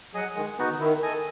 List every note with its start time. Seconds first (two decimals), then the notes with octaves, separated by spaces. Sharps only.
0.14 F#3 G#4 D#5 F#5
0.36 D#3 G#3
0.58 C#3 B3 D#4 F#4
0.70 D#3
0.80 D#3 E4
1.03 A4 D#5 G#5